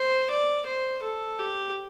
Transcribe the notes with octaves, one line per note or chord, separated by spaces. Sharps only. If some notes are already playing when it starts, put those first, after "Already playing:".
Already playing: C5
D5
C5
A4
G4